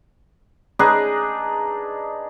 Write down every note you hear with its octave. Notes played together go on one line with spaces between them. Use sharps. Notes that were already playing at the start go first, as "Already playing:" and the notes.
D4 D#4 G#4 B4